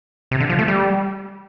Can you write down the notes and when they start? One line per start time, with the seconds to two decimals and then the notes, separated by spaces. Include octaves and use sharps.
0.31 C3
0.40 D3
0.50 F3
0.59 A3
0.68 G3